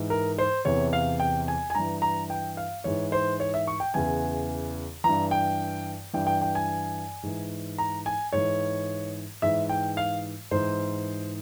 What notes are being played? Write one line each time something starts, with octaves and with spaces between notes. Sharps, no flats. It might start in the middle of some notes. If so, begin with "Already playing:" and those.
Already playing: G#2 E3
A#4
C5
E2 C3 E3 C#5
F5
G5
G#5
G#5
G2 E3 A#5
A#5
G5
F5
G#2 E3 C#5
C5
C#5
E5
C#6
G5
E2 C#3 E3 G#5
G2 E3 A#5
G5
G2 E3 G5
G5
G5
G#5
G#2 E3
A#5
G#5
G#2 E3 C#5
G#2 E3 E5
G5
F5
G#2 E3 C5